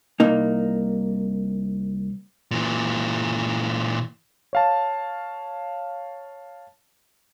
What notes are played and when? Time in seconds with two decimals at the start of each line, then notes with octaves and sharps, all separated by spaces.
0.20 C2 A#3 D#4
2.51 A#2 E3
4.53 C#5 F5 A5